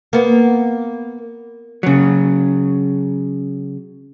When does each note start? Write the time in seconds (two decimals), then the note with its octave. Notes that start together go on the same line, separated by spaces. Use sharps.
0.13 A#3 B3
1.83 C#3 F#3